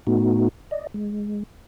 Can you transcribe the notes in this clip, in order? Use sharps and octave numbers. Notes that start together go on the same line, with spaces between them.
A2 A3 B3 D#4 F#4
D5 D#5
G#3